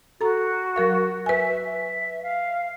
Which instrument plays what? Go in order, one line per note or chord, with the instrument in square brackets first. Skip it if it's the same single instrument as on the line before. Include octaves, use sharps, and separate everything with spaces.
[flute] F#4 [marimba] A4 A#5
[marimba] F#3 A#4 F5
[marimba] B4 G#5 [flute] E5
[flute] E5
F5